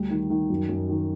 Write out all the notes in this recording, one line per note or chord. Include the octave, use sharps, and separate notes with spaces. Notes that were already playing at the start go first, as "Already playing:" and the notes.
Already playing: D2 G3
D#3
D#3
F#2
F#2
D#3